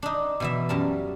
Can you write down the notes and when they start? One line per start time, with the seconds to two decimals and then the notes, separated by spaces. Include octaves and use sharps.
0.02 D4 D#4
0.40 B2 E3 E5
0.69 F#2 G3 A#4 A5